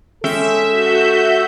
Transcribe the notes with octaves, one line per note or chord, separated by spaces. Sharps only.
G#3 C#4 A4 E5 G5
F#4 G6